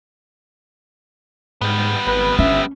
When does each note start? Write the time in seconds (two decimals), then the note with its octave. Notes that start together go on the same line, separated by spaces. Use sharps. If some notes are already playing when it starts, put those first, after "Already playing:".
1.61 G#2 G3 B3
2.07 G#1 B4
2.39 G1 C#4 E5